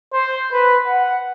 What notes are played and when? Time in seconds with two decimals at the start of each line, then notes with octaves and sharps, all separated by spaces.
0.13 C5
0.52 B4
0.86 F#5